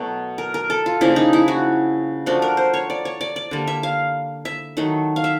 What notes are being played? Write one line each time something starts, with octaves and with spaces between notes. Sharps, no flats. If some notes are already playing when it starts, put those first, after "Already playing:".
Already playing: B2 F#3 A3
A#4
A#4
A4
F4
C#3 F3 A#3 D4 E4
D#4
E4
F#4
F3 A3 D4 F#4
A#4
C5
C#5
D5
C#5
D5
D5
D3 G3 A#3
E5
F5
E5
D#3 F#3 A3
F5
E5